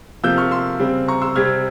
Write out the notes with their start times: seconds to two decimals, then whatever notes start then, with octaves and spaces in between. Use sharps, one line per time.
0.23 C3 F3 A#3 E6 G6
0.37 C#6 F6
0.51 C6 E6
0.79 C#3 G3 C4
1.08 A#5 C#6
1.21 C6 E6
1.35 C3 G3 C4 F6 G#6